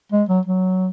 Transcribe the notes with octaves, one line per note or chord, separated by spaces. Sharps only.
G#3
F#3
F#3